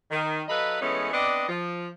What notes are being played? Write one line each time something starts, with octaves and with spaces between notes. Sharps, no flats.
D#3
F#3 A4 B4 D#5 F5 B5
E3 G#3 A3 B3 C#4
B3 C4 D4 D5 D#5
F3